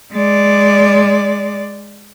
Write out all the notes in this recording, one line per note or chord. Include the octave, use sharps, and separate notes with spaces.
G#3 D5